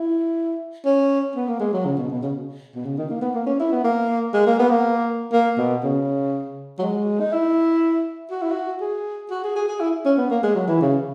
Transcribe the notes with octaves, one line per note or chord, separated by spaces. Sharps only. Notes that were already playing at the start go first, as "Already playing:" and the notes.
Already playing: E4
C#4
B3
A#3
G#3
F#3
C#3
B2
B2
C#3
B2
C#3
D#3
A#3
B3
A#3
C#4
E4
B3
A#3
G#3
A#3
B3
A#3
A#3
B2
C#3
F#3
G#3
D#4
E4
F#4
E4
F#4
G#4
F#4
G#4
G#4
G#4
E4
C#4
B3
A#3
G#3
F#3
E3
C#3